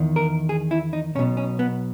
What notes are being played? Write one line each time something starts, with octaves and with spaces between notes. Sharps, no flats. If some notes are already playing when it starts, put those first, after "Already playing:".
Already playing: E2 D#3
A#4
G#4
E4
D#4
B1 B2 C#4
C#4
B3